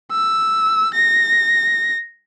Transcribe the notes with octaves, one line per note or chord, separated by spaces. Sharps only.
E6
A#6